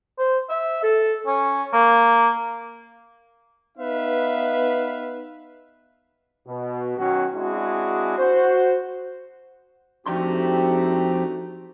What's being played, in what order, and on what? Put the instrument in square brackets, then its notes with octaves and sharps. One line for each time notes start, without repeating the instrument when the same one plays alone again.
[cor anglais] C5
E5
A4
C#4
A#3
[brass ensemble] B3 D#4 B4 E5 F5
[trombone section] B2
D#3 F#3 C#4 F#4
G#3 C4 D4 E4 F#4 G#4
F#4 C5
[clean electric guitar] F2 D4 C6 [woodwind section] A3 D#4 F#4 [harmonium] C4 G4